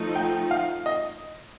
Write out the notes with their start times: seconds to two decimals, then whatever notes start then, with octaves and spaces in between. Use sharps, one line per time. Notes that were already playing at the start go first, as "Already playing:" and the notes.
Already playing: F3 A3 D#4
0.16 G5
0.51 F5
0.86 D#5